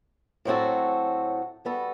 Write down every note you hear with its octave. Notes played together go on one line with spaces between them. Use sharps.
A2 F#3 C4 F#4 A4
G3 B3 F#4 A4